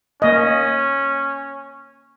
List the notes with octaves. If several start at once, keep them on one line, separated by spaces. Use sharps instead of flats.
A#3 C#4 D#5